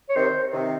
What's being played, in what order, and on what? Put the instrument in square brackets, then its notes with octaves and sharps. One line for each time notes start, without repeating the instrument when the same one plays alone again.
[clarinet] C#5
[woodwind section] C3 D#3 [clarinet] C5
[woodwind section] C3 D#3